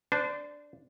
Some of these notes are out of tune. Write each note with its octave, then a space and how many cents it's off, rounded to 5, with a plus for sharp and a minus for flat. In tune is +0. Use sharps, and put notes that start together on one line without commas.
D4 +0 C5 -30